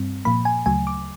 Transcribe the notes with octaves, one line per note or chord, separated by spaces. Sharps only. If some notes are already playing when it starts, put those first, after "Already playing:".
Already playing: G2 G3 C4
A#2 F3 A#3 B5
G#5
D2 C#3 F#3 A3 G#5
D6